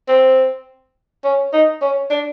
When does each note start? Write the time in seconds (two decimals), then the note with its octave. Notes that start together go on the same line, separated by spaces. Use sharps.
0.08 C4
1.24 C#4
1.53 D#4
1.82 C#4
2.11 D4